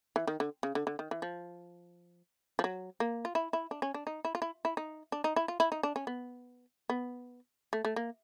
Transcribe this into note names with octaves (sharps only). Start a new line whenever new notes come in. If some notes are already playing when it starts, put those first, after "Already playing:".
E3
D#3
D3
C#3
D3
D3
D#3
E3
F3
F3
F#3
A#3
F4
E4
E4
D4
C#4
D4
D#4
E4
F4
E4
E4
D#4
D4
D#4
E4
F4
E4
D#4
D4
C#4
B3
B3
A3
A3
A#3